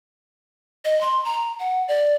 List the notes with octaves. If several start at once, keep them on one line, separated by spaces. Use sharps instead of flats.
D#5
C6
A#5
F#5
D5